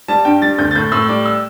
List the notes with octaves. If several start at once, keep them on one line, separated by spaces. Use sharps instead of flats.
G3 A5
G2 G5
G3 A6
D2 G6
A6
A2 G6
A2 E6
G3 D6
E6